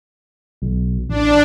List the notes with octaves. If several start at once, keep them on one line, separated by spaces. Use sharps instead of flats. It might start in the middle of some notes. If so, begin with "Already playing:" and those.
B1
A1 D4